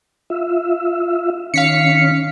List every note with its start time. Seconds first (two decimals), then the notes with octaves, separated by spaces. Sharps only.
0.30 F4 E5
1.54 D#3 C#4 F5 B6 C#7